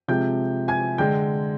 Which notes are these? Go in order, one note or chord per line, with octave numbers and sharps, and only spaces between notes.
C3 F3 G#3 G5 G6
G#5 G#6
D3 G#3 G5 G6